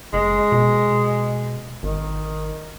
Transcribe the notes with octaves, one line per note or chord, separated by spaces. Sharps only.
F#1 G#3
B2
G#1 D#3